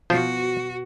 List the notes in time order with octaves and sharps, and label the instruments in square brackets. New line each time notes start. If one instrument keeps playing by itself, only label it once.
[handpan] B2 [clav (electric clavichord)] F3 F4 C5 [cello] F#4